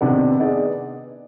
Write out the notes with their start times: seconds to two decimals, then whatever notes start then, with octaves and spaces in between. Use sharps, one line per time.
0.01 C3 D#3 B3 D4
0.40 B3 D#4 G#4 D5